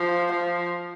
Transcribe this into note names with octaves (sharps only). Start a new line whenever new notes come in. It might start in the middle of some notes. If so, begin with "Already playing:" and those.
Already playing: F3
F3